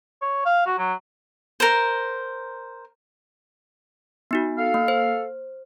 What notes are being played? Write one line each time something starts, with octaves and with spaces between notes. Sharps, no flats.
C#5
F5
F#4
F#3
A#4 C5
B3 D#4 F#4
A4 F5
A#3
C5